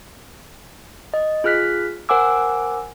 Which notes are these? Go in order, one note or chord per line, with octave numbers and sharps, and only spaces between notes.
D#5
F4 G#4 F6 F#6 B6
A#4 C5 F#5 G#5 D6 E6